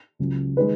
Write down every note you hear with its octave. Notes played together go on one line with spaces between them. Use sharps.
C#2 C#3 F#3
D#3 G#3 B4